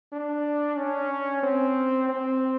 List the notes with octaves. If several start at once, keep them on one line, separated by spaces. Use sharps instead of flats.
D4
C#4
C4
C4